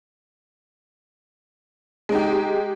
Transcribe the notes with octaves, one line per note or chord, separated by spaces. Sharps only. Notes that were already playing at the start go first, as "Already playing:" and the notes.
G#3 D#4 G4